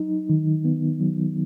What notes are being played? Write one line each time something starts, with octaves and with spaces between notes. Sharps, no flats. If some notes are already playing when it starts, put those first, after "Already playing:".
Already playing: F#3 D#4
D#3
B3
F#3